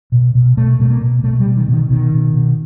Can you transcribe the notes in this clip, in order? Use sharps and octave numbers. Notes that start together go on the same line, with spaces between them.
B2
B2
B2 A3
B2 A3
A#3
B2
B2 A3
G3
B2
D#3
B2 D#3
B2 D#3
B2
B2